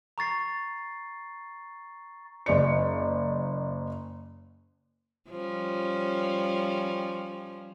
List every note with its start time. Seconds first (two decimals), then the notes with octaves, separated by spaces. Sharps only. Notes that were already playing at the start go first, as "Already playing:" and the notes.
0.18 A#5 C#6 A6 C7
2.46 F#1 D5 C#7
5.30 F3 G3 C#4